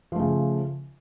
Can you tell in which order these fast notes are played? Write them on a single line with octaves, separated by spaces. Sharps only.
F3 A3 C#3